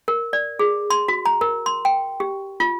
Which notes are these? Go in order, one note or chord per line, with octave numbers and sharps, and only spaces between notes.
A#4
D5
G#4
C6
F#4
A#5
A#4
C6
G5
G4
F4